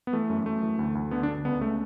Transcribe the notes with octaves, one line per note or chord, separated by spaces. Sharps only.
B3
E3 A3
F#2
F#2 A3
E3
D2
D2
D3 B3
D4
D3
C#2 B3
C#3 A3